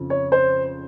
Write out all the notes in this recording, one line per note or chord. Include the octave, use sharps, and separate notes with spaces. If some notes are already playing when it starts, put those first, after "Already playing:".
Already playing: F2 C#3 F3
C#5
C5